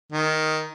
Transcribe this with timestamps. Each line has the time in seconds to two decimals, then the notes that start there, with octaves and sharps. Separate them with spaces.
0.12 D#3